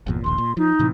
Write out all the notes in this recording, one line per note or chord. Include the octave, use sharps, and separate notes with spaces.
G1 E2 A#2
E1 A#1 D#2 C6
A#2
F3 D#4
A2 C3 E3